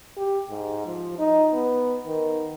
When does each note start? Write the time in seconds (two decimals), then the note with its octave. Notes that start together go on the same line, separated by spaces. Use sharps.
0.17 G4
0.50 G#2
0.87 F3
1.19 D#4
1.53 B3
2.06 D#3